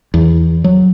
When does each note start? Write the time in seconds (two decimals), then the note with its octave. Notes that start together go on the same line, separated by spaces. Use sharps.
0.14 E2
0.64 F#3